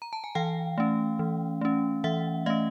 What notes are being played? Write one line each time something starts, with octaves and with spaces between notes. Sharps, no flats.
A#5
A5
G#5
E3 F5 G5
A3 C#4
E3
A3 C#4
E3 E5 F#5
A3 C#4 D#5 F5